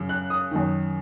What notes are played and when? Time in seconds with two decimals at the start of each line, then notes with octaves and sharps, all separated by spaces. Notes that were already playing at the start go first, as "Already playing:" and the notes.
Already playing: F#2 C#3
0.09 F#6
0.30 D#6
0.51 F#2 D#3